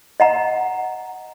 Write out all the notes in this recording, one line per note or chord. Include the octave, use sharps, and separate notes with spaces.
D#5 F#5 A#5